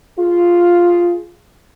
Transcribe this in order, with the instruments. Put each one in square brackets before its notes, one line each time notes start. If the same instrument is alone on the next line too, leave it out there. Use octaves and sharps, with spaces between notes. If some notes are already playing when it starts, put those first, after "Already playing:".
[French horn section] F4 G#4